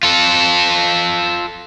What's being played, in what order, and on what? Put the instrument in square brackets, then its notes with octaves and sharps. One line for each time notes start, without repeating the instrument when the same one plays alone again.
[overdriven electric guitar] F4 A4